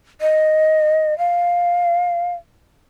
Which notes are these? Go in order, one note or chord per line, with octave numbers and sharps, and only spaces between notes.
D#5
F5